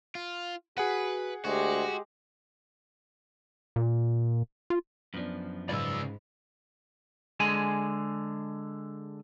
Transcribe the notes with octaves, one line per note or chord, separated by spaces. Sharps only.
F4
F#4 G#4 B4 F#5
D2 G#3 F#4 G4
A#2
F4
F#2 F3 B3 D4
G#2 C#3 F4 D5 B5 E6
D3 G#3 G#4 G#5